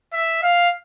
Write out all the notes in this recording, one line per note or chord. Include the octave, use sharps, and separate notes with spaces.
E5
F5